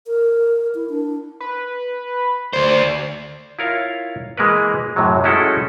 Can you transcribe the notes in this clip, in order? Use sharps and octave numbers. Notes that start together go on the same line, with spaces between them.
A#4
E4
D4
B4
D2 C5 D5
E4 F4 A#4 C#5 F5
E3 G#3 A#3 A#4 B4
F#2 A2 C3 F#3
G#3 A3 C#4 E4 F#4 A4